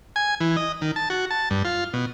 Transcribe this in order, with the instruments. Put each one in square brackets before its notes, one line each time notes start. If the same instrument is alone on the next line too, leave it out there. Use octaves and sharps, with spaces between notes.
[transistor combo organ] G#5
E3
D#5
D#3
A5
F#4
A5
G2
F4
B2